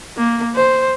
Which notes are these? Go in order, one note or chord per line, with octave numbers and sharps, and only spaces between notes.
A#3
C5